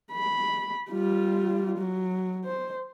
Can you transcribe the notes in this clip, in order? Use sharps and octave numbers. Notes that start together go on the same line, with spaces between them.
B5
G3 F4
F#3
C5